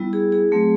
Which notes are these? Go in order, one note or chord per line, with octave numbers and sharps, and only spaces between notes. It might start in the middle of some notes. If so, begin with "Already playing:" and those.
Already playing: G3 B3 E4
G#4
G#4
F#3 A3 C4